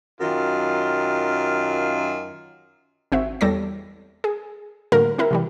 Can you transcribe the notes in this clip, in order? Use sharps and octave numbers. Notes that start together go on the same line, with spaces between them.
F#2 D#3 F4
G#1 C4 F#4 E5
E2 G3 A4 C#5 A#6
G#4
A2 D3 G3 A#3 F#4 A#4
C4 E4 A#4
C3 E3 G3